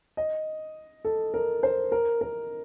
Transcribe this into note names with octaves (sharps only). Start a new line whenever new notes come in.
D#5
A4
A#4
C5
A#4
A#4